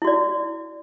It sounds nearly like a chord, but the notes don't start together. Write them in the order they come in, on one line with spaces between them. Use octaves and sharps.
E4 F#4 D5